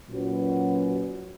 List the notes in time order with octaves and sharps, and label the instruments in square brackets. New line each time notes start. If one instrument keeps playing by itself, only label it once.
[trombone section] A#2 F#3 C#4 F#4 B4